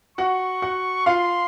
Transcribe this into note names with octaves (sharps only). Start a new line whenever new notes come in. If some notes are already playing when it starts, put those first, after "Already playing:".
F#4 F#5 C#6
F#4 F#5
F4 F5 C6